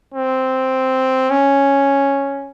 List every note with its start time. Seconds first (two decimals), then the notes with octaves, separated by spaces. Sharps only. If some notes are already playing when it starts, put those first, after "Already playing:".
0.14 C4
1.30 C#4